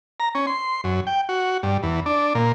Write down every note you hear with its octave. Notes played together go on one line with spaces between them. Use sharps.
A#5
C#4
C6
F#2
G5
F#4
G2
E2
D4
A#2